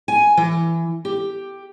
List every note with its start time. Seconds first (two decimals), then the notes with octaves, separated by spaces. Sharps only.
0.08 G#5
0.37 E3
1.05 G4